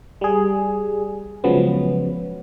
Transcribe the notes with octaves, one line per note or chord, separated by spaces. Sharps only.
G3 G#4
C#3 F3 F#3 G#3 B3 C#4